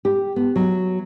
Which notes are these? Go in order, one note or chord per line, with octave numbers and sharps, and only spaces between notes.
G4
B3
F#3